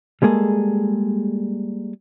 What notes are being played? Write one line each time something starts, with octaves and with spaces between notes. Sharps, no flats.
G3 G#3 A#3 G#4 A4